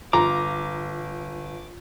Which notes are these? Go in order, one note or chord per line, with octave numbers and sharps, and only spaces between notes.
G1 F4 A#5 D6